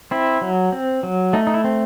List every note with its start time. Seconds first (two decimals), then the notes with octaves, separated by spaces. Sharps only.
0.11 C4 E4
0.41 F#3
0.72 C4
1.03 F#3
1.33 A3 D#4
1.47 D#4
1.54 E4
1.64 C4